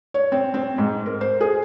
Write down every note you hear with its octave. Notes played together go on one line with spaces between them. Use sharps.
C#5
C4
C4
G#2
A#4
C5
G#4